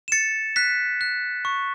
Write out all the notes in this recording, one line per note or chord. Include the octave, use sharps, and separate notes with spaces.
E7
A6 C#7
F#6 B6
F#6
C#6